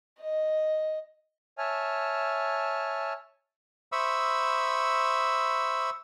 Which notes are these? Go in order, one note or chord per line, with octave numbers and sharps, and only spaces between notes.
D#5
C#5 E5 G#5 A5 F6
C5 E5 B5 C#6 D#6 E6